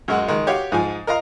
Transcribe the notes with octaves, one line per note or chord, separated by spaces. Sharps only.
F#2 G#3 F#4
D#3 G#3
F#4 G4 C#5 F5
G#2 F3 G#5
A#4 D#5 F5 A#5